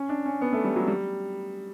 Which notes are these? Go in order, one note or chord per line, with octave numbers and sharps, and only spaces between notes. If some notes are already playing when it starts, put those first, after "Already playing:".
Already playing: C#4
D4
C#4
B3
A3
G3
F#3
G3